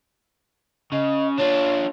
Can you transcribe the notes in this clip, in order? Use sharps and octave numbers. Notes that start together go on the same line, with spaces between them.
C#3 D#5
D4 F4 C#5